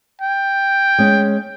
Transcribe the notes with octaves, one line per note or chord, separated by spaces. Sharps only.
G5
G#3 C#4